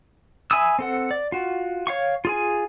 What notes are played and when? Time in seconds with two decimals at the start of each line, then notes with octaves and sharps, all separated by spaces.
0.51 E5 G#5 B5 D#6 E6
0.79 C4 A4 F#5
1.11 D5
1.32 F4 F#4
1.87 C#5 F5 C#6
2.25 F4 G#4 G#5